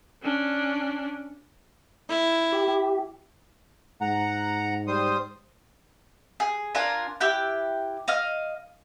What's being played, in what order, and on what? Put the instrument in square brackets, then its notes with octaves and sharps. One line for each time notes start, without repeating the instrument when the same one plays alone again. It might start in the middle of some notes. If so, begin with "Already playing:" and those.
[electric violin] C#4 D4
[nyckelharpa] E4
[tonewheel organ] G4
[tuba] G#2 [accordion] F#5 A#5
[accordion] G3 C5 D#6
[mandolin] G#4
D4 F4 A#4 G#5
E4 G4 G5 F#6
D#5 F5 F6